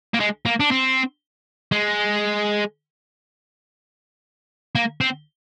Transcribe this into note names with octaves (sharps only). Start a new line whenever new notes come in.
A#3
G#3
A#3
D4
C4
G#3
A#3
C4